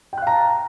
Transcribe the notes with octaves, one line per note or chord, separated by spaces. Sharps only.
F5 G5 A5 A#5 F#6